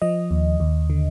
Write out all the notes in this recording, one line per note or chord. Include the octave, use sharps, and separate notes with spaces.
F3 D#5
D#2
D#2
D3